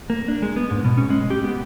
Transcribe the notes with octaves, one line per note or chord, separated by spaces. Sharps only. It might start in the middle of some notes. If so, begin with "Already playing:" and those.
A#3
D4
G#3
B3
G#2
B2
C#4
G#3
G4
B3